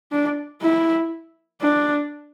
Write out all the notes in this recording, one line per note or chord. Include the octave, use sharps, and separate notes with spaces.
D4
E4
D4